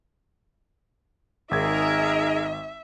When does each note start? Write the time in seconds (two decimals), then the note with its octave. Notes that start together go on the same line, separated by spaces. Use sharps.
1.51 G#1 D#4 G#4 A#4 E5 G#6